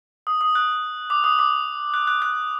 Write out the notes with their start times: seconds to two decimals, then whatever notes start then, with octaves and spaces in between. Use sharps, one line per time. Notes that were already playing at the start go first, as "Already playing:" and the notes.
0.27 D#6
0.41 D#6
0.55 F#6
1.10 D6
1.24 D#6
1.39 D6
1.94 F#6
2.07 F#6
2.22 F#6